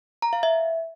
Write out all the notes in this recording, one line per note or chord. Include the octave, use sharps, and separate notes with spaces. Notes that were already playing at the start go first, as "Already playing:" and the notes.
A#5
F5
E5